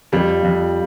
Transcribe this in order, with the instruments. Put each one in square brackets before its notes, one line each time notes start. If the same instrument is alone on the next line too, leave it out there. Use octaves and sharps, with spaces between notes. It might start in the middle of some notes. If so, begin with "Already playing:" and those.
[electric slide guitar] F2 [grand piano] G3
[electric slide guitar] F2